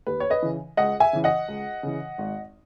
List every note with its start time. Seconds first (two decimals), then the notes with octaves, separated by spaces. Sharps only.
0.07 D#2 B4
0.20 C#5
0.30 B4 D#5
0.42 C#3 E3
0.77 C#2 D#5 F#5
1.00 E5 G#5
1.13 C#3 E3
1.24 D#5 F#5
1.48 C#2
1.83 C#3 E3
2.18 G#1